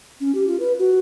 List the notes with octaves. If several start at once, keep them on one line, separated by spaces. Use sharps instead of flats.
C#4
G4
F4
B4
F#4